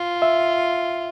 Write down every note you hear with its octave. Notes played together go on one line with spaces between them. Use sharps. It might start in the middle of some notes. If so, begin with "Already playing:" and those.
Already playing: F4
E5